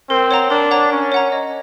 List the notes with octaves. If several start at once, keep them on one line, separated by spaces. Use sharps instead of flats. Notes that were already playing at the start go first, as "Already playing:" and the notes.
C4 A#4
C#5 F#5 A#5
D4 A#4
C#5 F#5 A#5
C#4 A#4
C#5 F#5 A#5
D#5